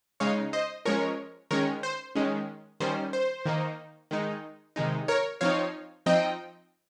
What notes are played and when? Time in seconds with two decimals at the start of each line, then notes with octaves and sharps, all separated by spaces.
0.20 C#3 G#3 D#4 C#5 F5
0.53 C5 D#5
0.85 F3 G#3 C#4 A#4 C#5
1.51 D#3 G#3 C#4 A#4 C#5
1.83 C5
2.15 D#3 G#3 C#4
2.80 D#3 G3 C#4 C5
3.13 C5
3.46 D#3 A#3 D#4
4.11 D#3 G#3 D#4
4.76 C3 D#3 G#3 D#4
5.08 A#4 C#5
5.41 F3 C4 D#4 C#5 F5
6.06 F3 C4 D#4 D#5 G5